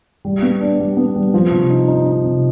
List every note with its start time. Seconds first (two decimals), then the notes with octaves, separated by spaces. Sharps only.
0.25 G3
0.42 B3
0.61 D4
0.80 G3
0.97 B3
1.16 G3
1.34 F3
1.51 C3
1.70 D#4
1.88 D#4
2.06 D#4
2.24 C3